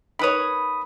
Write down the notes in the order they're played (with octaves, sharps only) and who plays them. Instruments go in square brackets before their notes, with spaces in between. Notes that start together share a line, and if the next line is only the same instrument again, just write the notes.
[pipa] D#3 B4 C#5 [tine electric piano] B5 D#6